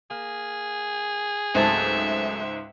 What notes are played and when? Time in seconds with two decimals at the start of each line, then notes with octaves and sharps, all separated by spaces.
0.11 A#3 G#4
1.55 C#2 G#2 F#3 A3 C4 C5 E5